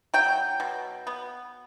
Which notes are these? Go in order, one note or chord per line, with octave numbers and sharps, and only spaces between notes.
F#3 G5
B2
B3